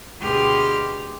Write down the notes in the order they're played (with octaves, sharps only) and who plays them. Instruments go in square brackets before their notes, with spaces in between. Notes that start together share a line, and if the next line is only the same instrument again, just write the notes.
[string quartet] D2 B2 G4 G#4 C6 F6